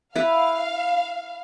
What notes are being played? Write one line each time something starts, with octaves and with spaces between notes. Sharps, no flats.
E4 B4 F5